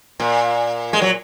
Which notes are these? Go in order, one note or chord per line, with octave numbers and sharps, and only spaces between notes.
A#2
G#3
F#3